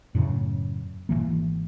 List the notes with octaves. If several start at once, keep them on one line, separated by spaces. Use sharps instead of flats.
F#2 A2 C#3
G#1 F#2 E3 A#3